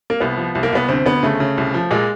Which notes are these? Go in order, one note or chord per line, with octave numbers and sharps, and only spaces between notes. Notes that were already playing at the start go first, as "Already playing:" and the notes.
A#3
C2 B3
F3
C2
A#3
C2 B3
D2 C4
D2 B3
C#3 A3
C#3
C2
F3
A#2 G#3